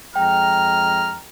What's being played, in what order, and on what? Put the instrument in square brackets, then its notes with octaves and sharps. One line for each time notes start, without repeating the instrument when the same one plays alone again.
[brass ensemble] F2 G#3 A#5 [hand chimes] G5 [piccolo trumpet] F6